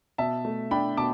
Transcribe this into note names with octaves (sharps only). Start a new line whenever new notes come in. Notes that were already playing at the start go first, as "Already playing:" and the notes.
B2 E5 A5
A3
D4 G5 B5
B2 A5 D6